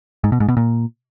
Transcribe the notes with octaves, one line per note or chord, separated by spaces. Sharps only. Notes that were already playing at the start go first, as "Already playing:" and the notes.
G#2
B2
G#2
B2
A#2